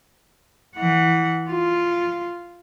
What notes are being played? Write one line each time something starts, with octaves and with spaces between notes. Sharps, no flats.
E3 F#5
F4